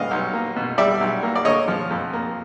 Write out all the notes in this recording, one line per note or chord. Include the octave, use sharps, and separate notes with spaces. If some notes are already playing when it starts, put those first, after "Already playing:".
Already playing: B2 G3 D#5 F5
B1
A#3
B2
G3 D5 E5
B1
A#3
D5
D3 C#5 D#5
F3
F2
A#3